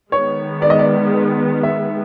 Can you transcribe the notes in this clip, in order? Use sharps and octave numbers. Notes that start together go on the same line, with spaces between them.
D#3 G#3 B3 C#5
D5
D#5
D5
E5